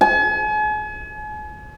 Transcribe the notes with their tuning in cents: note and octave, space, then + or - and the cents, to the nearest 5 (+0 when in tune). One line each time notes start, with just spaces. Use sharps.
G#5 +40